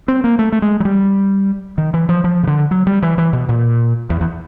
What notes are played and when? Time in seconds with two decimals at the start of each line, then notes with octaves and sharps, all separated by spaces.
0.08 C4
0.24 A#3
0.39 A3
0.52 A3
0.62 G#3
0.80 F#3
0.85 G3
1.78 D#3
1.94 E3
2.09 F3
2.24 F3
2.43 C#3
2.47 D3
2.71 F#3
2.87 G3
3.02 E3
3.18 E3
3.33 B2
3.49 A#2
4.10 E2
4.21 E2